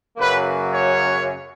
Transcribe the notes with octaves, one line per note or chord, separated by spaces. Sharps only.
F#2 C#3 F#3 A#3 B4
C#5